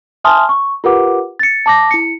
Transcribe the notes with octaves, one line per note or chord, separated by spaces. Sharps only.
E5 G#5 A5 C6 D#6 F6
C#6
F4 G4 A#4 B4 F#5 D6
A6 C#7
A5 D6 A#6
E4 C#7